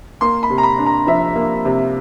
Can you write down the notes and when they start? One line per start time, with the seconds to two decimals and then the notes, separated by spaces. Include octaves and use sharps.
0.21 A#3 C6
0.43 B5
0.50 C3
0.58 A#5
0.63 B5
0.78 D4
0.86 A#5
1.07 F3 E5
1.35 A#3
1.65 C3